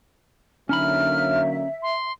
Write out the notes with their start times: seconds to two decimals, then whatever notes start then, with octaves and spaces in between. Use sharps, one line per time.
0.69 D3 F#3 A#3 C#4 D#4 E5 B5 F6
1.82 C6